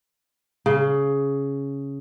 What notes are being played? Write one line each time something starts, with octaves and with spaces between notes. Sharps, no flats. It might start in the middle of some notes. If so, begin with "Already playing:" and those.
C#3